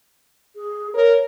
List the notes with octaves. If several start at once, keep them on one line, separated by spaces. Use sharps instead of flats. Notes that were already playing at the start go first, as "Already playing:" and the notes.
G#4
A#4 C#5